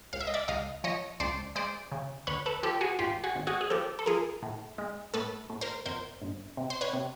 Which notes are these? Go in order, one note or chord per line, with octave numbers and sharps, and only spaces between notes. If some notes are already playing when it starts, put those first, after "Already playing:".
C#2 F5
E5
D#5
D5 E5
C#2 D#5 F5
F3 C#5 D#5
C#2 C5 D5
G#3 C5 D5
C#3
D2 B4 C#5
A4 B4
F3 G4 A4
F#4 G#4
G#1 F4 G4
F#4 G#4
G#1
F#4 G#4
G#4
F3 G4 A4
A4
F3 G#4 A#4
A2
G#3
A2 A4 B4
A2
A#4 C5
F2 A#4 C5
G1
C3
C5
B4 C#5
C3